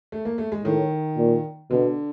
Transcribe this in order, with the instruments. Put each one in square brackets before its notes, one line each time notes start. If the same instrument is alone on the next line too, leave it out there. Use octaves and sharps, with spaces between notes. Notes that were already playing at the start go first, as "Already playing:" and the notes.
[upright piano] A3
A#3
A3
G#3
[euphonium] A2 [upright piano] D#3
[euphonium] A#2
[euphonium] B2 [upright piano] D3